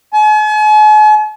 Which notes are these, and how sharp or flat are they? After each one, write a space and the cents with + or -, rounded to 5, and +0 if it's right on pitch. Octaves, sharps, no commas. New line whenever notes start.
G#5 +45